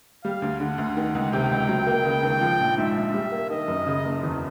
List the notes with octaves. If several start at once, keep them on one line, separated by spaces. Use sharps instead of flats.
G3 F5
D2
D3 F#5
D2
D#3
C#2
C3 G5
C#2
F#3
A#3
C#3
D#2
F3
A#1
G#2 E5
A#1
G3
A#3
D#3 D#5
F#2
C#3
F#1
E2